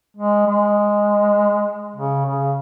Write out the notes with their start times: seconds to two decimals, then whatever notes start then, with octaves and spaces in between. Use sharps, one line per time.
0.17 G#3
0.47 G#3
1.96 C#3
2.25 C#3